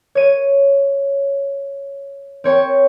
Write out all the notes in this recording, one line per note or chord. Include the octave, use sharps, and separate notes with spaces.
C#5 D#7
C4 C#5 C#6